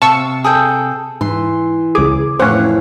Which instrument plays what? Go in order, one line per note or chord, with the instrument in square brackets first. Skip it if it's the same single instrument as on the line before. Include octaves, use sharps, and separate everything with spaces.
[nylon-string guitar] C3 [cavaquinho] F5 [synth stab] A5 C#6 E6
[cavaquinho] G#4 A4 G5
[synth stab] G#2 [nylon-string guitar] E3 [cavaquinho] C6
[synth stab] C#2 G#4 [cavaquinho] D6
[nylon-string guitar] F2 A2 E3 [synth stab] C4 C#4 [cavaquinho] F#5